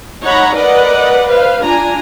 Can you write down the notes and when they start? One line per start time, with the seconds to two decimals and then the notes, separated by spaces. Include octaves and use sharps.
0.23 D#4 C#5 F#5 A#5 B5
0.55 A#4 B4 D5 D#5 F#5
1.28 B4 C5 F5
1.63 D4 F4 G#5 A#5